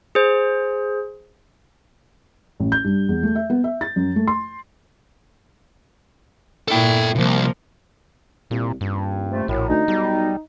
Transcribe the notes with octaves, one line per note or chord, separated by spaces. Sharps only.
G#4 C5
A1
G6
G2
E2
A3
E5
B3
E5
A6
F#2
A3
C6
A#2 E4 A4 G5
C2 C3 F3 A#3
C2 A#2
D#1 G2
C3 A3
A#1 F#2 A2
D2 D#4
B1 G3